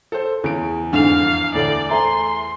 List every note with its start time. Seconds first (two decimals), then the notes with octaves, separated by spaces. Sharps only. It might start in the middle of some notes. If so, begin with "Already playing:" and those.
0.12 A4 C5
0.44 E2 C#3 D7
0.93 F2 G#2 D3 D4 F5 F7
1.54 D2 A2 A3 D5
1.91 A3 C5 E5 G#5 A#5 C6